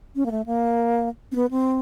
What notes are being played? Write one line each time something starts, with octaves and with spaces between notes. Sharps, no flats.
C#4
A#3
A3
A#3
C4
B3
C4